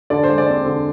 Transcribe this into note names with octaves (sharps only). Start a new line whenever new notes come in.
D3 D5
C5
G#3
D5
C4
D3